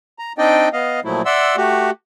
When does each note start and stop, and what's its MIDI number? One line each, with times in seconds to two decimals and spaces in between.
0.19 0.33 82
0.38 0.69 60
0.38 0.69 62
0.38 0.69 63
0.38 0.69 74
0.38 0.69 75
0.38 0.69 79
0.73 1.00 59
0.73 1.00 75
0.73 1.00 77
1.05 1.22 46
1.05 1.22 53
1.05 1.22 54
1.05 1.22 57
1.05 1.22 64
1.26 1.56 74
1.26 1.56 76
1.26 1.56 78
1.26 1.56 84
1.26 1.56 88
1.57 1.91 57
1.57 1.91 66
1.57 1.91 67